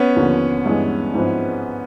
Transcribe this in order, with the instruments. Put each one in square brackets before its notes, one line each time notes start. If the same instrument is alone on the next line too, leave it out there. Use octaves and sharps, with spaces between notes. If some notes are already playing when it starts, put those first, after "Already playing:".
Already playing: [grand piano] B3 C#4
[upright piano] D#2 D3 F3
G2 E3 G#3
G#2 F3 G#3 C4 E4